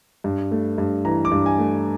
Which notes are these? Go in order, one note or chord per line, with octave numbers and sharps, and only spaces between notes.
G2
A3
G2
E3 A#5
D6
G2
G#5
A3